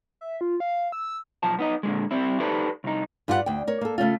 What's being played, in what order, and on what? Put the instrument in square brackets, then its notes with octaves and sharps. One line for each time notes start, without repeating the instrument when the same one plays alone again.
[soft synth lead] E5
F4
F5
E6
[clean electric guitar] B1 F3 A5
B3 D#4 D#5
A#2 D3 G#3
G3 C4 E4
D#4 G4 A4 B4 C5 D5
C2 D#4
[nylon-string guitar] G2 G3 F4 G4 G#4 F#5
D2 G5
A#4 C#5
A#3 A4
C#3 A3 C#4 F4